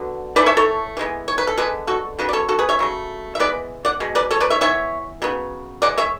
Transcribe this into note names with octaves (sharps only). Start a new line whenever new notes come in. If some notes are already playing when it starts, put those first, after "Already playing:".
Already playing: D3 F#3 B3
E3 A3 B4 D5
C#5 E5
A4 C#5
E3 G#3 B3
C#5
B4
A4
D3 G#3 B3 G#4 B4
F#4 A4
C#3 F#3 B3 B4
D5
A4 C#5
F#4 A4
G#4 B4
C#5 E5
C#3 F#3 A3
E5
E3 G#3 B3 B4 D5
D5 F#5
B2 G#3
B4 D5
A4 C#5
B4 D5
C#5 E5
E3 B3 C#5 E5
C#3 F#3 B3
E3 G#3 D5 F#5
C#5 E5